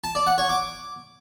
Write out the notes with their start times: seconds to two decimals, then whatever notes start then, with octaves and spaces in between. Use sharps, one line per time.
0.04 A5
0.15 D5
0.27 F#5
0.38 C#5
0.49 D6